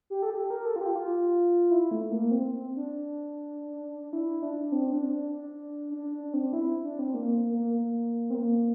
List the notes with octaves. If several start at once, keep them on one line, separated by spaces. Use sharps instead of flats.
G4
A4
G4
A#4
A4
F4
G4
F4
E4
A3
A#3
C4
C4
D4
E4
D4
C4
D4
D4
D4
D4
D4
C4
E4
D4
C4
A#3
A#3
A#3
A#3
C4
A#3